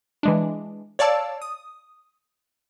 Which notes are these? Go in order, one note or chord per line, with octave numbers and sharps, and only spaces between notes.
E3 G#3 D4
C#5 D5 F5 A5 E6
D#6